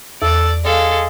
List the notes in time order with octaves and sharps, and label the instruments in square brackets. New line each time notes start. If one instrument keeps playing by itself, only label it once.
[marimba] E2 [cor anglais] A4 [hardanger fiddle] D5
[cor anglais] G#3 [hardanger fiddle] A4 F5 [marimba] D5